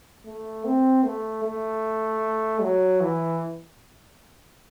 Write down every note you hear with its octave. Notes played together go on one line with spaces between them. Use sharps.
A3
C4
A3
A3
F#3
E3